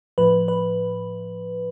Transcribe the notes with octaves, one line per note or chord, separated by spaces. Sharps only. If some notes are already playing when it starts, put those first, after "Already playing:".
A2 F3 B4
B4